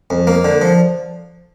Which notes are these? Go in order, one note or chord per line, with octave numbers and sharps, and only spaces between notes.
F2
A#3
D3
F3